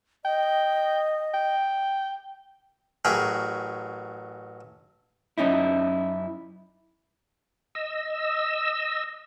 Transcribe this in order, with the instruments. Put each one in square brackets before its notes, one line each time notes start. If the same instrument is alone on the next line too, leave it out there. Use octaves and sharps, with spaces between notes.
[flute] D#5 [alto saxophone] G5
[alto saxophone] G5
[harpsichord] A1 F#3 G#4 A#4 G5 B5
[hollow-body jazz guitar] F#2 C#4 D#4 E4
[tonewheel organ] D#5 E6